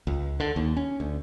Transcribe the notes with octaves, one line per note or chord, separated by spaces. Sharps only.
C#2
D3
D#2
C#4
D2